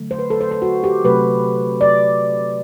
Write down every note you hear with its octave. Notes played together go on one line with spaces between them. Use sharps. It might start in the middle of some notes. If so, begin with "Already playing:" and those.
Already playing: D3 F#3 A3
C5
B4
A4
C5
C5
F#4
G4
C3 F#3 A3 B4
D5